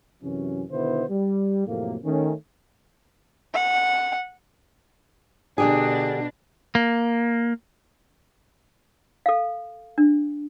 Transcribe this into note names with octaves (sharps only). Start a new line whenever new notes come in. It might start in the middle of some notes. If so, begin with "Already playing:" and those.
F#2 C3 E3 F#3 C#4
B2 D3 D#3 B3 E4 C5
G3
F2 A2 C3 F#3 A#3
D#3 A3 C#4
F#5
B2 D3 D4 G4 G#4
A#3
A4 F5
D4